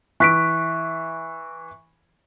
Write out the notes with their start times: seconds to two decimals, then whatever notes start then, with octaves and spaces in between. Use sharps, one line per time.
0.20 E3 C#6 F#6 B6 D7